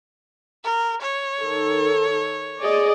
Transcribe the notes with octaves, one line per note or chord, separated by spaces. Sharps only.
A#4
C#5
D#3 A4
G#4 D5 D#5